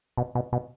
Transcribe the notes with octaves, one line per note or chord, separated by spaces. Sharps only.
B2
B2
B2